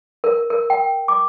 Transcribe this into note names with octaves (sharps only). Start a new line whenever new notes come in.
A#4
A#4
G5
D6